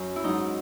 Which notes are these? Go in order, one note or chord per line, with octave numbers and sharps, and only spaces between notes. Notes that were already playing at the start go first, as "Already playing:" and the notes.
Already playing: F#2 C#4
E4
G#2 F#3 D#4